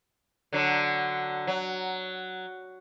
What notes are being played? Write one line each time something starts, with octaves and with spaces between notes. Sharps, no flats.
D3 F#3
F#3